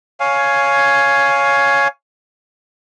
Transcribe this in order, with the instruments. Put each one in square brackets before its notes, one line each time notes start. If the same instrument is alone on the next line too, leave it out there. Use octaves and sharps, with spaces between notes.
[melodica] C#5 F5 G#5